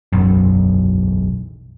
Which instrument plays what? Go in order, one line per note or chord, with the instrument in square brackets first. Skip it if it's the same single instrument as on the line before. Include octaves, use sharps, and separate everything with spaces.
[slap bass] E1 B1 [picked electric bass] F#2